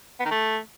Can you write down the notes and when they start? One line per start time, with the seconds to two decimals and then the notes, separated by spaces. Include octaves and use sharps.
0.19 B3
0.25 D#3
0.31 A3